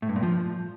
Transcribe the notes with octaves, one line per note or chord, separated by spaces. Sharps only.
A2
G2
A#2
F3